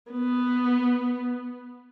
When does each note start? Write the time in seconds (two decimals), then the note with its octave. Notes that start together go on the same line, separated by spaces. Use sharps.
0.11 B3